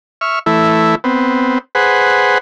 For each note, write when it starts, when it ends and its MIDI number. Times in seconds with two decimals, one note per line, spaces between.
0.21 0.39 76
0.21 0.39 85
0.21 0.39 89
0.46 0.95 52
0.46 0.95 57
0.46 0.95 64
1.04 1.58 59
1.04 1.58 60
1.75 2.38 68
1.75 2.38 71
1.75 2.38 72
1.75 2.38 78